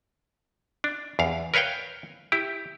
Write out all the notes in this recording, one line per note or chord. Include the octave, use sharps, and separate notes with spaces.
D4
E2 F5
A#4 B4 C#5 F5 G5
E4 G4